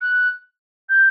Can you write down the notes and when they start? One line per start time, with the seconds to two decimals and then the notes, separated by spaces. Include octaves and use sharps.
0.01 F#6
0.89 G6